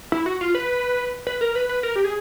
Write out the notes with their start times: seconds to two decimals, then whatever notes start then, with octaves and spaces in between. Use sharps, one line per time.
0.12 E4
0.26 F#4
0.41 F4
0.55 B4
1.27 B4
1.41 A#4
1.55 B4
1.69 B4
1.83 A#4
1.96 G4
2.05 G#4